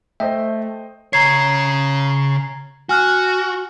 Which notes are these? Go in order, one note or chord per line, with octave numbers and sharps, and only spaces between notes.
A3 C5 D#5 E5 G5
C#3 C#5 A#5 G#6 C7
F#4 G#5 F6 F#6